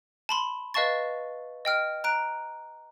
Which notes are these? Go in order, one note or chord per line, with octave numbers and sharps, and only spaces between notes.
A5 B5 C6
B4 D#5 F5 A5 C#6 A6
D#5 G5 F6
A#5 F#6 D7